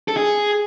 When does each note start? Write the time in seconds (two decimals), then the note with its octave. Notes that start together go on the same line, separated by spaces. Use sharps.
0.08 A4
0.17 G#4